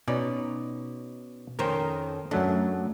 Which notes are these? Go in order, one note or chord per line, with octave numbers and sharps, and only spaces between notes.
B2 C#4 D#4 D5
F2 D#3 C#4 A#4 C5 G5
F#2 F#3 A3 D4